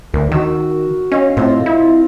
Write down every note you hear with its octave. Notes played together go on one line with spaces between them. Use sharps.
D2 A#4
D#3 F#4 E6
C#4 D#5 F5
A2 C4 F4
E4